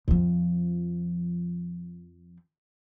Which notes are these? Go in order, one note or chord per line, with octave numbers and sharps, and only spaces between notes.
F2 F3